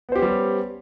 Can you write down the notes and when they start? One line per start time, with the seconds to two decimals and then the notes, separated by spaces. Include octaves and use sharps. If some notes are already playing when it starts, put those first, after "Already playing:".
0.09 B3
0.12 C5
0.15 G4
0.19 C#4
0.22 G3